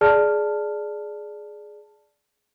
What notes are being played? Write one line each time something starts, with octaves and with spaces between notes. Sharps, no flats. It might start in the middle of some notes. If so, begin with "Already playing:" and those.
G#4 D5 A5 F6